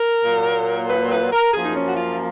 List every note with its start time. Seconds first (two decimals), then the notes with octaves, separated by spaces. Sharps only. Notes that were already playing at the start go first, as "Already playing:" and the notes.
Already playing: A#4
0.23 A#2 F#3 A#3
0.88 B4
1.10 B4
1.32 A#4
1.53 F#2 F3 A#3 G#4
1.64 D#4
1.76 C#4
1.88 F#4
1.97 F4